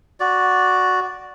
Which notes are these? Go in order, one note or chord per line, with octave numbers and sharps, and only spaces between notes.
F#4 D5